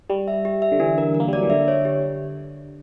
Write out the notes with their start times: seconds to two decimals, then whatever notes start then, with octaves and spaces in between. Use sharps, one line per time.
0.09 G3 G4
0.28 E5
0.45 G4
0.62 E5
0.72 D3
0.80 E3 D4
0.98 A#4
1.14 A#4
1.20 A#3
1.28 G3
1.33 F#3 D5
1.43 E3
1.50 D3 E5
1.68 C#5
1.85 G4